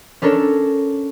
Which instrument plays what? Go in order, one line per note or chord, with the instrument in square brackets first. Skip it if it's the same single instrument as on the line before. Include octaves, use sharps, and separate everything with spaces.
[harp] C#4 D4 A4 A#4 C#5